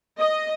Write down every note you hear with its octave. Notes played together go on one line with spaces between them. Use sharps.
D#5